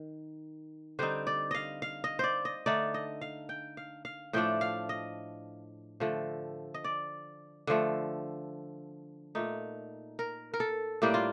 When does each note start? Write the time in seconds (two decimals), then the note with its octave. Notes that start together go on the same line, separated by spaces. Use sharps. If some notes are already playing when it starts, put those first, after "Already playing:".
Already playing: D#3
0.99 D3 G3 C4 D#4 C5
1.27 D5
1.51 D#5 F5
1.82 F5
2.04 D#5
2.19 C5 D5
2.45 D#5
2.66 D3 A3 D#4 D5
2.94 D#5
3.21 F5
3.49 G5
3.77 F5
4.05 F5
4.33 A2 F3 A3 D4 G5
4.61 F5
4.89 D#5
6.00 D3 F3 A3
6.74 D#5
6.84 D5
7.67 D3 F3 A3
9.35 A#2 A3 D#4
10.19 A#4
10.54 A#4
10.60 A4
11.02 A2 G3 A#3 D4 G4
11.14 F4